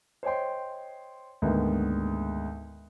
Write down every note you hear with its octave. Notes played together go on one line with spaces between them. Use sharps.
C5 C#5 D#5 G5 C6
D2 G#2 D#3 G#3 A#3 B3